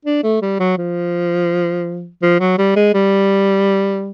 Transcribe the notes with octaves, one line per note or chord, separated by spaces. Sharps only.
D4
A3
G3
F#3
F3
F3
F#3
G3
G#3
G3